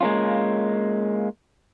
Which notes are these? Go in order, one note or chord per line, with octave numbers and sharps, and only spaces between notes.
G#3 A#3 C4 C#4 F4